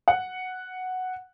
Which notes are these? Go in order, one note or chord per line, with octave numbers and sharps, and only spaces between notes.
F#5